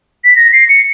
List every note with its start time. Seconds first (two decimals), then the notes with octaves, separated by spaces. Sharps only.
0.24 B6
0.36 A#6
0.53 C7
0.69 C#7